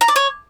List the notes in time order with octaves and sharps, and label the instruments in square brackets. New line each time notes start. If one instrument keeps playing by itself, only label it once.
[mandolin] A#5
D5
C#5